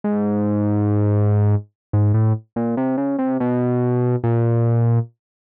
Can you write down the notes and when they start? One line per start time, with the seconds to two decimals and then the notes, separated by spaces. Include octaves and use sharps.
0.04 G#2
1.93 G#2
2.14 A2
2.56 A#2
2.77 C3
2.98 C#3
3.19 C3
3.40 B2
4.24 A#2